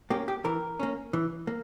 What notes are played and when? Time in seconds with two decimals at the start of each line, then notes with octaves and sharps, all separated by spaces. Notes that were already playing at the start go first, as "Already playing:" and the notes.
0.10 A#3 C#4 G4
0.28 G4
0.45 E3 A#4
0.80 A#3 C#4
1.13 E3
1.47 A#3